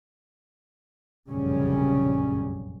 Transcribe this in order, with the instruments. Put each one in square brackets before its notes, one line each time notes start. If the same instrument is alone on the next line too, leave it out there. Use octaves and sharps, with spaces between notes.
[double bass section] F1 A#1 F#2 C#3 G3 C#4